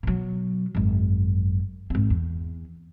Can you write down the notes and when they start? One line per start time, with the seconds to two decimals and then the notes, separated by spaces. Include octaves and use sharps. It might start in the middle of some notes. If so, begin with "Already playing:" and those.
0.03 B2 F#3
0.75 G#1 F#2
1.90 G#1 C4
2.10 E2